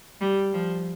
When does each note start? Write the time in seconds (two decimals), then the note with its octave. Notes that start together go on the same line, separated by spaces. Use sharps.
0.21 G3
0.53 F3